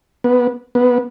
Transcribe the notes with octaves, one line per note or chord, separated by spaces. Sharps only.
B3
B3